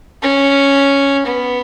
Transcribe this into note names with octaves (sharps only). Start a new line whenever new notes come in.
C#4
B3